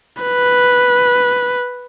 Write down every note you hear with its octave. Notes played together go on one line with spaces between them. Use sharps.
B4